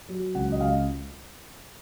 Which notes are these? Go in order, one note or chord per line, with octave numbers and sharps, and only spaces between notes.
F#3
C#2 F#5
D#5
C#2 F5